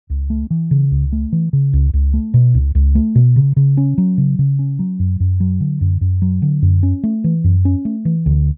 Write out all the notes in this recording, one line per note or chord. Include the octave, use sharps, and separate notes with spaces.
C#2
A3
E3
C#3
C#2
A3
E3
C#3
C#2
C#2
A3
B2
C#2
C#2
A3
B2
C#3
C#3
C#4
F#3
C#3
C#3
C#4
F#3
F#2
F#2
F#3
D3
F#2
F#2
F#3
D3
F#2
C#4
A3
E3
F#2
C#4
A3
E3
D2